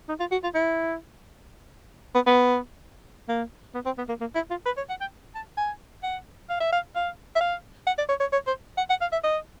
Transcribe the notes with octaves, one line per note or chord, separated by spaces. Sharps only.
D#4
F4
F#4
F4
E4
B3
B3
A#3
B3
C4
B3
A#3
A#3
E4
F4
B4
C#5
F#5
G5
A5
G#5
F#5
F5
E5
F5
F5
E5
F5
F#5
D5
C#5
C#5
C#5
C5
F#5
F#5
F5
E5
D#5